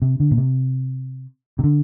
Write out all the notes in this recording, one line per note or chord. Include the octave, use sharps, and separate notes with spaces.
C3
D3
A#2
C3
C3
D3